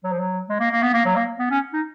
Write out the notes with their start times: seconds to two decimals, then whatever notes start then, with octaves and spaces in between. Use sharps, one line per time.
0.04 F#3
0.12 F3
0.19 F#3
0.49 G#3
0.60 A#3
0.71 A#3
0.82 B3
0.94 A#3
1.05 F#3
1.16 A#3
1.39 B3
1.51 C#4
1.73 D#4